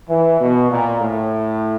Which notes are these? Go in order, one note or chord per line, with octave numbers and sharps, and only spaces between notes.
E3
B2
A#2
A2